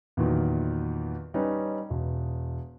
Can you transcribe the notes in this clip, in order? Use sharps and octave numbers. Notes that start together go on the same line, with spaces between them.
E2 A#2 D#3 F#3
G3 C#4 D#4 B4
E1